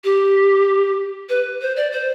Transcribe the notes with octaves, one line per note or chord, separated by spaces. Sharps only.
G4
B4
C5
D5
C5